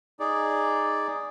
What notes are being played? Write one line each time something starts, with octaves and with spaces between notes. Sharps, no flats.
D#4 G#4 D5